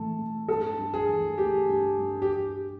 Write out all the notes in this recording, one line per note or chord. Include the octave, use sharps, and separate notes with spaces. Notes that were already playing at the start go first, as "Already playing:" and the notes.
Already playing: A2 E3 A3 A4
A2
G2 A4
G2
G#4
E3
A3 G4
G2
G2
G4